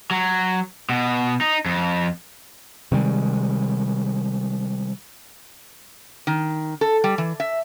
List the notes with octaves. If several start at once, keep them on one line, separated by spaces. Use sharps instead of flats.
F#3
B2
D#4
F2
C3 D#3 G3 G#3
D#3
A4
G3
E3
E5